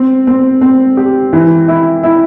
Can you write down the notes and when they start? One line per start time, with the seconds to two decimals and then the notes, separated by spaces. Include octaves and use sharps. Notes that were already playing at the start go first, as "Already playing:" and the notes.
Already playing: C4
0.27 C4
0.61 C4
0.97 G4
1.33 E3
1.68 E4
2.03 E4